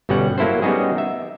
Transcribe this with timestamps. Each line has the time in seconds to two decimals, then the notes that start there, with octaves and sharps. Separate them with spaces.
0.09 G1 B2 G3 C#4 F#5
0.38 F#3 A#3 E4 A4 C5
0.62 G3 B3 C#4 D#4 F#4 G#4
0.95 D#4 E5